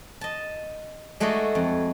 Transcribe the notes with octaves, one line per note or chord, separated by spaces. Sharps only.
D#5 A5
G#3 A3 D#4 F#4 D5 D#5
F2